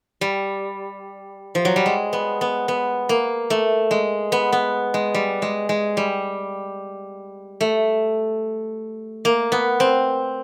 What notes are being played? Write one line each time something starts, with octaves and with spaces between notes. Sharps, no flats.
G3
F3
F#3
G3
G#3
B3
B3
B3
A#3
A3
G#3
B3
B3
G#3
G3
G#3
G#3
G3
A3
A#3
B3
C4